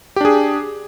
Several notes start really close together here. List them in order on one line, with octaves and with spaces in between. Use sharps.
G4 D4 G#4